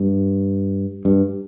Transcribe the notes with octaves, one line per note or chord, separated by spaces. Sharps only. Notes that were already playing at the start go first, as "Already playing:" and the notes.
Already playing: G2
G2